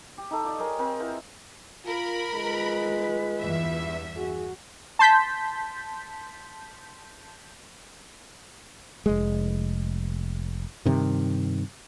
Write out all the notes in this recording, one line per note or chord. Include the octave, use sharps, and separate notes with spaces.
G4
D#4 A4
F4 D5 D#5
G#4 A#4 C#5 D#5
C4 A#4 C5
E4 F4 B4 C5
F4 A#4 B5
G#3 F4 B4
E2 G2 E5
F#4 G#4
A5 C6 G6 B6
F1 G#3
G2 C3 D#3